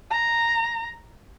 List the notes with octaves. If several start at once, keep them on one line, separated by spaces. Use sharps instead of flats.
A#5